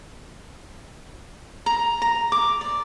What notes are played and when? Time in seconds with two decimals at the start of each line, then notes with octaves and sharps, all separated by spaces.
1.66 A#5
2.02 A#5
2.32 D6
2.61 D5